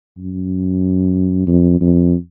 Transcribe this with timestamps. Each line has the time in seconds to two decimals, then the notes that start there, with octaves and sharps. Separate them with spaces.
0.18 F#2
1.47 F2
1.81 F2